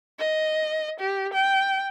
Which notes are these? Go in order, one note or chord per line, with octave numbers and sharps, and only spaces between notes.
D#5
G4
G5